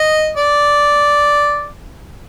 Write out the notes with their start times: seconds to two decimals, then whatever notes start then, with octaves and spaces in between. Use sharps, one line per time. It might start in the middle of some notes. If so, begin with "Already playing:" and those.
Already playing: D#5
0.37 D5